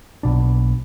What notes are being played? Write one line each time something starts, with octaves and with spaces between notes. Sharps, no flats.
B1 B2 D4